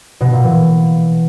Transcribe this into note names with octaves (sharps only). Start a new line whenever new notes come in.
B2
A#2
E3